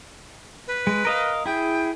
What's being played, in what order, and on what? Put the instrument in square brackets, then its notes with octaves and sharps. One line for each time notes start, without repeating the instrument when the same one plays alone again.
[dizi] B4
[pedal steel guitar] G#3
A#4 D#5 F5
[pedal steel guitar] E4 G#4 [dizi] G5